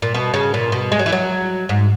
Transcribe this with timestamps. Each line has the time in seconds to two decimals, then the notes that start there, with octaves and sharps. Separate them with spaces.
0.02 A#2
0.14 B2
0.34 C#3
0.54 A#2
0.72 B2
0.92 G#3
0.99 F#3
1.06 E3
1.12 F#3
1.69 G#2